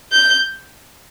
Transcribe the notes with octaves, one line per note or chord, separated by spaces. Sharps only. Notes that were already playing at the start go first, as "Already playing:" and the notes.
G6